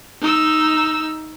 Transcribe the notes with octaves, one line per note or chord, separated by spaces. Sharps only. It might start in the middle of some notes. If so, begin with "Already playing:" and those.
D#4 E6